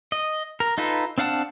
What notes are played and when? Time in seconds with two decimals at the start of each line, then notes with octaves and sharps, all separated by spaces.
0.12 D#5
0.60 A#4
0.78 D#4 F4 A4 B4
1.18 C4 D4 F5 F#5 A5